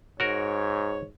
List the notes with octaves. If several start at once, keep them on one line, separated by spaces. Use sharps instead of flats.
G#2 F#4 A#4 C#5